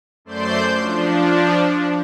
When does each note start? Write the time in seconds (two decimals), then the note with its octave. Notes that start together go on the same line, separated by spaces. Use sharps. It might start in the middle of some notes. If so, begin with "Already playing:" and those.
0.25 F#2 A3 C5 D5 C6 G6
0.75 F3 D4